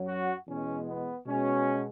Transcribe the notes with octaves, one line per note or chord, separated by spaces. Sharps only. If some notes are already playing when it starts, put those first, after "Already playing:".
Already playing: F#2 F#3
F#4
E2 B2 G#3 C#4
B3
B2 G#3 C#4